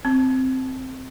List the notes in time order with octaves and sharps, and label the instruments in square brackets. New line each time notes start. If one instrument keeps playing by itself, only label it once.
[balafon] C4